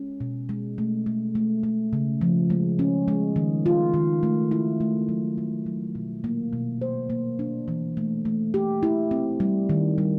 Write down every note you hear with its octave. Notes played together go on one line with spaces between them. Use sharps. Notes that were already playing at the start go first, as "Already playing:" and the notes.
Already playing: G#3 C#4
B2
G#3
A3
A3
A3
A3
C#3
F3
G#3
C#4
G#3
D#3
F4
D#3
A3
E4
A3
F#3
A3
F#3
B2
A#3
B2
C5
A#3
D4
E3
A3
A3
G4
E4
C4
G3
D#3
G3